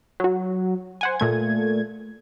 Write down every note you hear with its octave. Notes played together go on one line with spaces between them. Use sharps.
F#3 F#4
C5 F#5 G#5
A#2 A3 G#6